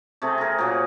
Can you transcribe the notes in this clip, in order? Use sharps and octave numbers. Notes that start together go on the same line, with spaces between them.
C3 A3 C4 G#4
G#4 A#4
A#2 F#3 G#4